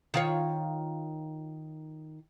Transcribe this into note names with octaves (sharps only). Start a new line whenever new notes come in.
D#3 F4 C#5